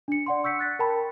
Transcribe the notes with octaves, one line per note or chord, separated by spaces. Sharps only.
D4 C#7
D5 F#5 C6
C#6 E6 G6 B6 C#7
F#6 A6 B6
A#4 G5 A5 B5